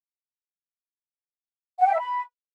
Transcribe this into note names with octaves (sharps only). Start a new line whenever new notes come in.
F#5
G5
E5
B5